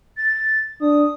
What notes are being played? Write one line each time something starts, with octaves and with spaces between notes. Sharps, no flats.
A6
D4 D#6